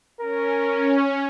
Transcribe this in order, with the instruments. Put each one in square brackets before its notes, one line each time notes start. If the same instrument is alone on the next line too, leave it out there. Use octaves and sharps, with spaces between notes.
[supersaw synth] C#4 [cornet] A#4